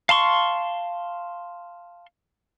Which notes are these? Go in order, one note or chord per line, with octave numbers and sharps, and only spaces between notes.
F5 A5 C6 C#6